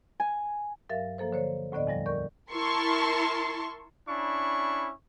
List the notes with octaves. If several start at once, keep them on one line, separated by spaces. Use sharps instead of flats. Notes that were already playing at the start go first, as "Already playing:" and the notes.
G#5
G2 F#3 A#4 E5 F5 A6
F3 A#3 A4 C5
D3 C5 C#5
D2 A2 D3 B3 D5 D#5
E2 F3 G3 A#6
A#4 D5 C#6 G6
E4 A#4 A5 C6 C#6
C#4 D4 E4 B5 C#6